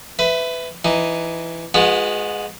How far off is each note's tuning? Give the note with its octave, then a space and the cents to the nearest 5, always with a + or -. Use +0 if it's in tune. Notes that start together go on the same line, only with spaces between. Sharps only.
B4 +20 E5 +0
E3 +15 D#4 +0
G#3 +0 B3 +0 F#4 -45